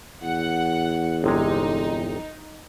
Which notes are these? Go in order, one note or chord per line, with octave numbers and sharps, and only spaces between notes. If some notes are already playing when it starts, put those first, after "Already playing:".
E2 F#5
G1 C3 G#3 D#4